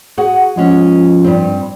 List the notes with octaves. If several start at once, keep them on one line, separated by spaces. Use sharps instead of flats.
F#4 G#4 F#5
F3 G#3 C#4
G2 C4